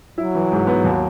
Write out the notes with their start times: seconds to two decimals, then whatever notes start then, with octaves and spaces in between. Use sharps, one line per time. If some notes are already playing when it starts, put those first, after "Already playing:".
0.18 F#3 E4
0.35 E3
0.52 G#2
0.67 B3
0.84 D#2